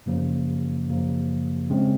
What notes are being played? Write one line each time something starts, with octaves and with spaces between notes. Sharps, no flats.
F#2 C#3 F3 A#3
F#2 C#3 F3 A#3
C#3 G#3 C4